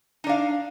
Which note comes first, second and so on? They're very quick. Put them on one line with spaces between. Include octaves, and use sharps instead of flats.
D#4 D4 F5